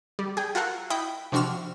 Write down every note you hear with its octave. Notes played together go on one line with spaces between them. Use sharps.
G3
G#4 G5
F4 F#4 A4 A#4 F#5
E4 D#5 G5 B5
C3 F3 D4 F#4 E6 F6